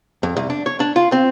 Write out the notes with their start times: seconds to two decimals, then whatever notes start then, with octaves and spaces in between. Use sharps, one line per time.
0.23 F2
0.36 C2
0.50 D4
0.66 C#5
0.80 D4
0.96 F4
1.12 C4